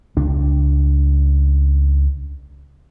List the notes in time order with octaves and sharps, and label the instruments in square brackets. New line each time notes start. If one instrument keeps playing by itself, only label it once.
[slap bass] C#2 D4